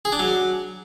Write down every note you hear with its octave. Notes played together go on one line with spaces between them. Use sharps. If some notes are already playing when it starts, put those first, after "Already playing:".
G#4
D4
F#3